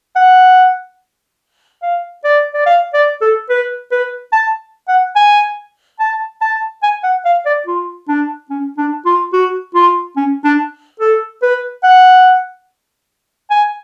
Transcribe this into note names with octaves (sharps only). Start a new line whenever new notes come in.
F#5
F5
D5
D5
F5
D5
A4
B4
B4
A5
F#5
G#5
A5
A5
G#5
F#5
F5
D5
F4
D4
C#4
D4
F4
F#4
F4
C#4
D4
A4
B4
F#5
G#5